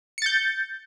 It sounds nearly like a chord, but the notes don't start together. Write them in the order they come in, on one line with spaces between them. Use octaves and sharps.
C#7 A6 G6